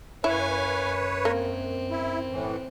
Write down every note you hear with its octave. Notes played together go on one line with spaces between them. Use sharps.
F#2 E4 B4 C#5 F5 G#5
A#3 C4
E4
A2 E3